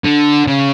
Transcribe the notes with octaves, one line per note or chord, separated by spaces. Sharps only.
D3
C#3